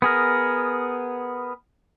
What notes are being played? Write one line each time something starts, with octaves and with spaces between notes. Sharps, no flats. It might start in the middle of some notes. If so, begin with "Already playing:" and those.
B3 G#4 A#4